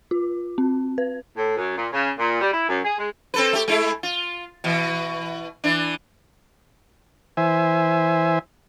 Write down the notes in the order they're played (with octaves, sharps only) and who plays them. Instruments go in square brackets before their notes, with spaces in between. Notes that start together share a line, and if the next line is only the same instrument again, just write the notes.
[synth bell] F4
C4
B4
[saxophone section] A2
F#2
A#2
C#3
A#2
G3
E4
F#2
G#4
G#3
[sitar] C4 A4 B4
A3 G4
G#3 A3 E4
F4
B2 E3
E3 D4
[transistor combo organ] E3 C5 E5 G#5